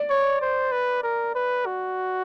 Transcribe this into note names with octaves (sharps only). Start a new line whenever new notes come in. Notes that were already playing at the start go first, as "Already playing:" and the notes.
Already playing: D5
C#5
C5
B4
A#4
B4
F#4